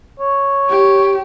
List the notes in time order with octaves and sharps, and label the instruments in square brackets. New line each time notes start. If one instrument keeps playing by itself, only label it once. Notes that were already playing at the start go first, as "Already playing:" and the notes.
[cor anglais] C#5
[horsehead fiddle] G4